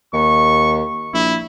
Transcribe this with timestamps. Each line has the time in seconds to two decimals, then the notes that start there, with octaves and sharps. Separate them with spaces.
0.13 D#2 C#6
1.14 A#1 E4